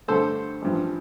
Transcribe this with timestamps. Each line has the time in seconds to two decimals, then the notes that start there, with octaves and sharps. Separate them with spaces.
0.08 G2 D3 A3 A4 C5
0.62 A1 G2 F3